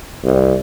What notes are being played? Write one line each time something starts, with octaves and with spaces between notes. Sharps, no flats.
C2